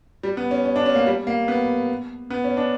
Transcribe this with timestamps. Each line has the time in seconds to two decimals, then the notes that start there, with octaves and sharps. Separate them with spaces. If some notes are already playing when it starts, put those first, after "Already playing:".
0.23 G3
0.37 B3
0.51 C#4
0.65 C#4
0.76 D4
0.86 C#4
0.95 A#3
1.06 G3
1.27 A#3
1.48 B3
2.30 B3
2.44 C#4
2.57 D4